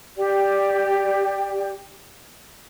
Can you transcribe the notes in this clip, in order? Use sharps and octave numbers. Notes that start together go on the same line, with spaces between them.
G4 D5